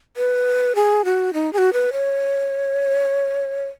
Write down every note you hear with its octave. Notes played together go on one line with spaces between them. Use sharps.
B4
G#4
F#4
D#4
G#4
F#4
B4
C#5